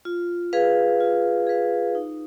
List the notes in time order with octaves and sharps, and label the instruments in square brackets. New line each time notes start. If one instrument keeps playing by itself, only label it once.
[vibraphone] F4
G#4 B4 F5
F4
G#4 B4 F5
D#4